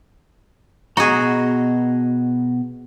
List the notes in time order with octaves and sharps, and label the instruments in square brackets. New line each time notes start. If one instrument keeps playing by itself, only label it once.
[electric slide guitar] B2 D#5 A#5 [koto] F#4 G#4